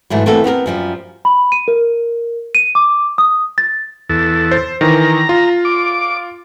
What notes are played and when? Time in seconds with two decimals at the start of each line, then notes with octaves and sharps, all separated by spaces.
0.10 G#2 E3 F#3 A3
0.26 E3 A3 A#3 C4 F#4 A4
0.44 B3 C4 G4 A#4
0.66 F#2 F3 G3
1.25 B5
1.52 D#7
1.68 A#4
2.55 D#7
2.75 D6
3.18 D#6
3.58 A6
4.09 E2 A4
4.51 C5
4.81 D#3 E3 A#5
5.29 F4
5.65 D6